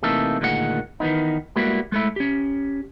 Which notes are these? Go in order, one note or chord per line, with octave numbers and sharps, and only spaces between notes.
C3 E3 A3 A#3 D#4 A4
D2 A#2 D#3 G#3 F#4 F#5
D#3 E3 A#3 B3 D#4
G3 G#3 A#3 B3 E4 F#4
G#3 A3 E4
C#4 G4